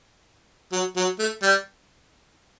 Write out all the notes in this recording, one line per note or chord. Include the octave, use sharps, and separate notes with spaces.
F#3
F#3
A3
G3